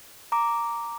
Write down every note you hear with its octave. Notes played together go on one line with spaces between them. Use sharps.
A#5 D6